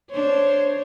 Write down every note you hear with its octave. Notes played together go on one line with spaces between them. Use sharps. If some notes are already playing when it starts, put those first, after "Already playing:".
D4 C5 C#5